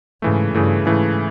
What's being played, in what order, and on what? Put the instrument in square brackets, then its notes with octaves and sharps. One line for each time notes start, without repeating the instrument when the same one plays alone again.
[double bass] G#2 [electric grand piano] C#3 E3 A3
[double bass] G2 [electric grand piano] C#3 E3 A3
[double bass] G#2 [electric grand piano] C#3 E3 A3